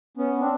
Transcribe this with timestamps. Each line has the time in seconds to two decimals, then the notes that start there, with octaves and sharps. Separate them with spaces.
0.17 B3 C#4
0.40 C4 D4